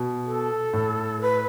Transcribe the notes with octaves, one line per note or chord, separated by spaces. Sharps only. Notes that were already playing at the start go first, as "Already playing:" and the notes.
Already playing: B2
A4
A2
B4